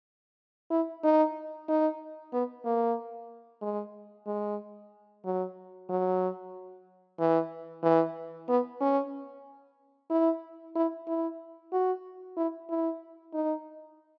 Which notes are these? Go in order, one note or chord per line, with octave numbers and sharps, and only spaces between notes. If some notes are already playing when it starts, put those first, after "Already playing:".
E4
D#4
D#4
B3
A#3
G#3
G#3
F#3
F#3
E3
E3
B3
C#4
E4
E4
E4
F#4
E4
E4
D#4